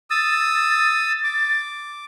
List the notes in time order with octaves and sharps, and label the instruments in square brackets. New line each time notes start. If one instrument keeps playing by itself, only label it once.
[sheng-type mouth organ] D#6 E6 [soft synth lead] A6
[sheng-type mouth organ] D6